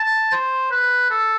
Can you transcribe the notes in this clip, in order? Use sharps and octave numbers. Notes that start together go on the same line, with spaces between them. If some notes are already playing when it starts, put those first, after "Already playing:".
Already playing: A5
C5
B4
A4